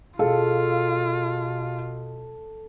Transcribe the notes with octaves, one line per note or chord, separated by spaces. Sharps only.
B2 F4 G#4 A4 F5